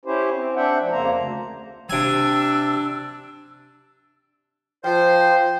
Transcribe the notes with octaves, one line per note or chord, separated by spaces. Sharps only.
C#4 E4 G4 C5
C4
C4 D4 E5 F#5 G5
D2 F3
F2 C#3 A#3 C5 A#5
D2
C3 D4 G#5 E6
F3 C5 G5